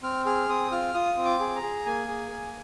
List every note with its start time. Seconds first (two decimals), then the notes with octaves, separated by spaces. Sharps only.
0.03 C4 F6
0.25 G#4 F6
0.49 C4 D#6
0.72 F4 F6
0.94 F4 D#6
1.17 C4
1.25 D6
1.40 G#4
1.56 A#5
1.63 G#4
1.86 A#3 G#5
2.08 G#4
2.31 A#3